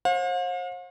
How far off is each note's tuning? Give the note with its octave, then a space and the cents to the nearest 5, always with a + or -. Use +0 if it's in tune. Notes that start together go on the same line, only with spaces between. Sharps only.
C5 +40 F5 +45